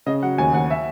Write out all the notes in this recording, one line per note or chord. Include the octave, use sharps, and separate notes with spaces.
C#3 D#5
F#3 F#5
D#2 G#5
D#2 F#5
E5